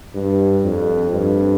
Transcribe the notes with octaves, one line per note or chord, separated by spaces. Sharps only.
G2
F2
G2